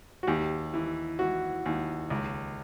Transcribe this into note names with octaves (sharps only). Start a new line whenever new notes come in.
F#4
D#2 G4
E3
E3 F#4
D#2
C#2